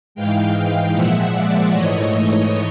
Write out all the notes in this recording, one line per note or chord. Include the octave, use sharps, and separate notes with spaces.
G#2 E3 G#3 F5 G5
A#2 F3 G#3 E5 F#5
D5 E5
G#2 E3 A3 C#5 D#5